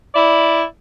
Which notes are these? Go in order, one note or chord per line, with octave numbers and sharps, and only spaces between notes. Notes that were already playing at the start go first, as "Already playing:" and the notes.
E4 D5